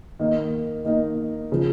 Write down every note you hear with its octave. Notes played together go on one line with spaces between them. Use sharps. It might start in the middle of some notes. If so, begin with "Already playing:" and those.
D#3 A#3 D#4
D#3 A#3 D#4
C#3 F3